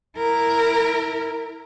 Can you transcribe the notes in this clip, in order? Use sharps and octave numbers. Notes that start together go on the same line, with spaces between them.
E4 A#4